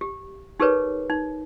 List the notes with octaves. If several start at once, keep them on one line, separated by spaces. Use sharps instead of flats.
G4
D#4 G4 G#4 A#4 B4 C#5
D#4